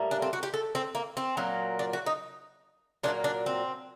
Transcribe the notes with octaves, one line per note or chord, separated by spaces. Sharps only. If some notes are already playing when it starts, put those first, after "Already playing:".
Already playing: A2 G3 A#3
D4
C4
F#4
G4
A4
C4
A#3
C4
A#2 F#3 A#3
D4
F#4
D#4
A#2 F#3 A#3 D4
D4
C4